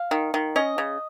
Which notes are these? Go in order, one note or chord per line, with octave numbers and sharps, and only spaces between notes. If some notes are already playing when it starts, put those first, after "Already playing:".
Already playing: F5
D#3
D#3
C#4 D#5
C#3